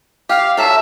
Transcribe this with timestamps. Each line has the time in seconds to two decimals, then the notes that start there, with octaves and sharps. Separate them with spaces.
0.29 G4 F5
0.57 F#3 A4 E5